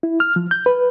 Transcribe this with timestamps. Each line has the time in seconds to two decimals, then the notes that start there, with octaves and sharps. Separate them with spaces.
0.03 E4
0.20 F6
0.36 F3
0.51 G6
0.66 B4